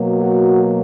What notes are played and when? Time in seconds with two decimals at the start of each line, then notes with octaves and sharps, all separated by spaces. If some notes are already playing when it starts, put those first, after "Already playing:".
Already playing: B2 F#3 A#3
0.20 F#4